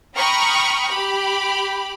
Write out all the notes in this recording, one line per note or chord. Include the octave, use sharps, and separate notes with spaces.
G5 A#5 B5 C#6 D#6 F6
G4 B5